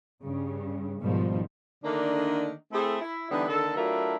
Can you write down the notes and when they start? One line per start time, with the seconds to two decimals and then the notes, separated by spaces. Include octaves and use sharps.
0.22 G2 C#3
1.01 G#2 B2 D#3 F3 G3
1.84 D3 D#3 A3 A#3 D4
2.73 A3 C4 E4 G#4 A4
3.01 E4
3.31 D3 E3 G3 B3 D4 D#4
3.48 D3 D#3 A#3 A4
3.77 F#3 A3 D4 E4 F4 A#4